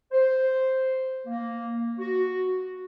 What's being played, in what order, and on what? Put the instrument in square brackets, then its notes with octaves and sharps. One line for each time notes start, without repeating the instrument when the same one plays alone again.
[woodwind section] C5
A#3
F#4